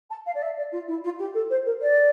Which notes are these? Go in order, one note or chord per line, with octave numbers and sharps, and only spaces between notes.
A5
F5
D5
E5
D5
F4
E4
F4
G4
A4
C5
A#4
D5